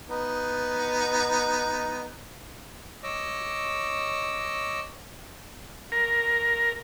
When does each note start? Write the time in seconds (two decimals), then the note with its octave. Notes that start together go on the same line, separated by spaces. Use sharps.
0.09 B3 D#4
3.03 C#5 D#5 D6 E6
5.92 A#4